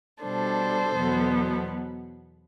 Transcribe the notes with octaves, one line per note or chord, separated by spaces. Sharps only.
B2 G3 D4 A4 C5
E2 B2 F#3 B3